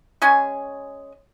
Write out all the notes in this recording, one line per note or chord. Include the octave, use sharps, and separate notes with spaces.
G#3 C#4 G#5